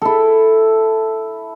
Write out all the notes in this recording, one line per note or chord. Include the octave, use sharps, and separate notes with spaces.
E4 A4